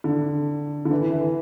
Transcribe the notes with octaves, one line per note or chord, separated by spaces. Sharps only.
D3
D3
E3
E3